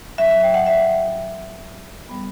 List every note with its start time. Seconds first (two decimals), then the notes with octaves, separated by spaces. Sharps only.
0.18 A2 F#3 C#4 E5
0.31 E5
0.43 G5
0.54 F#5
0.66 E5
2.09 A2 G3 B3